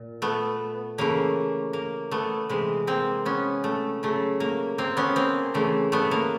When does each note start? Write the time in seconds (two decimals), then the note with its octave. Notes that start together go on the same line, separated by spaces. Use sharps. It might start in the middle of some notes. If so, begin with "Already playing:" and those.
Already playing: A#2
0.22 A3 B3
0.98 C#3 E3 A3 A#3
1.73 A#3
2.11 A3 B3
2.49 C3 E3 G#3
2.87 A#3 C4
3.26 B3 C#4
3.64 A3
4.03 C#3 F#3 A3
4.40 A#3
4.78 A#3 C4
4.97 B3 C#4
5.16 A#3 C4
5.54 C#3 E3 A3
5.92 A3 B3
6.11 A#3